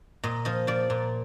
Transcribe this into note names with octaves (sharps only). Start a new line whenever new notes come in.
A#2 D#5
F3 D#5
F3 D5
A#2